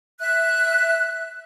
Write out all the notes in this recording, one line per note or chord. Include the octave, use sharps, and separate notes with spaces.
E5 F#6